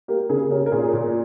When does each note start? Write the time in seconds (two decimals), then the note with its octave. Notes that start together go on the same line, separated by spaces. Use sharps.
0.08 A#3 G4 A#4
0.29 C#3 G#4
0.51 C#4 G4 A#4
0.66 A#4
0.72 A#2 G#4
0.93 A#2